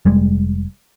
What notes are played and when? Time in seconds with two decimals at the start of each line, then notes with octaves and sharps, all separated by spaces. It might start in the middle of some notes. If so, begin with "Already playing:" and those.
0.05 F1 G3 G#3